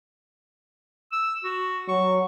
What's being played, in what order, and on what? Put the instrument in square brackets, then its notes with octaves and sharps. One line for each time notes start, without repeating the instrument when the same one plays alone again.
[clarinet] E6
F#4
[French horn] F#3 [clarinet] C#6